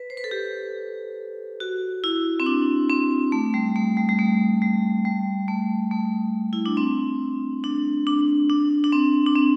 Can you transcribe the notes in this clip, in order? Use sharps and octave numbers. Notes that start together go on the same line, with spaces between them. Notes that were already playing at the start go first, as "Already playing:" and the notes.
Already playing: B4
C5
B4
A4
G4
F#4
E4
C4
D4
C4
A3
G3
A3
G3
G3
A3
G3
G3
A3
A3
E4
D4
C4
D4
D4
D4
D4
C4
D4
C4